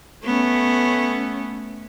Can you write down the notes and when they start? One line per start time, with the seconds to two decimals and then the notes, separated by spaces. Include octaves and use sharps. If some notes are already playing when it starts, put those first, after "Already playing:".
0.25 A3 B3 C#4